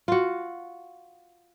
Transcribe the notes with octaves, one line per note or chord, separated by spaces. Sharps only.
F4 F#4